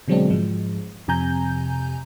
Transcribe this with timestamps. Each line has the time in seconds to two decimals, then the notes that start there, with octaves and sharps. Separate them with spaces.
0.08 B2 D3 F#3 G#3 C4 D4
0.30 G#2 F3 G#3
1.08 F2 C3 G#5 A#5 G6